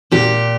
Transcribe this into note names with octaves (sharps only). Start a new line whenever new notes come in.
A#2 G4